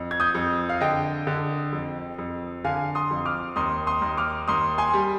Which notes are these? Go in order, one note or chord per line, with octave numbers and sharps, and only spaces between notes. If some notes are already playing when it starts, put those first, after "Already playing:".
Already playing: F2
G#6
D#6 G6
F2
F5
D3 D#5 G5
D3
F2
F2
D3 F5 G#5
C6 D#6
F2
D6 F6
D#2 C6 D#6
C6 D#6
D#2
D6 F6
D#2 C6 D#6
G#5 C6
G3